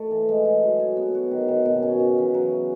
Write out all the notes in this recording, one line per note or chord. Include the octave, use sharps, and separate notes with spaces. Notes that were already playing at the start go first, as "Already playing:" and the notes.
Already playing: A3
E3
G#3
G#4
F#3
G#4
B3
F#4
D#3
D#3
B2
C#4
C#3
E3
F#3